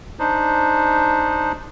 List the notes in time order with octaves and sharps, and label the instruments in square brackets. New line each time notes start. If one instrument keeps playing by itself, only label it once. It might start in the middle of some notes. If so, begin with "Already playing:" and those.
[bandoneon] D4 D#4 C5